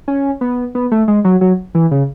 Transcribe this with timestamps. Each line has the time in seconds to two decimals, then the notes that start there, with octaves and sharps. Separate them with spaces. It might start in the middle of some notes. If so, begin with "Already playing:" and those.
0.08 C#4
0.41 B3
0.75 B3
0.91 A3
1.08 G#3
1.25 F#3
1.41 F#3
1.75 E3
1.91 C#3